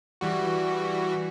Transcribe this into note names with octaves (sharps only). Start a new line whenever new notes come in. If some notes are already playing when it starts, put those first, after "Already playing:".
E3 G3 F#4